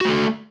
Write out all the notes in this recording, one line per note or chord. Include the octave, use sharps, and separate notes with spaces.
A3 F#4 A4